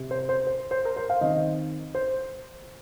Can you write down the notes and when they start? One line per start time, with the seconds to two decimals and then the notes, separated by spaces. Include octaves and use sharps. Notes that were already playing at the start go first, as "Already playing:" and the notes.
Already playing: C3
0.11 C5
0.29 C5
0.47 C5
0.71 C5
0.85 A#4
0.96 C5
1.10 F5
1.21 D#3 C4 D#5
1.95 C5